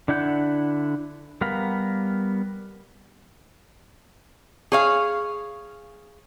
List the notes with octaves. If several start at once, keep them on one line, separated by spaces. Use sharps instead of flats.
D3 D4 E4 F#5 G6
G3 B3 A#4 F5 B5
G#4 C#5 F5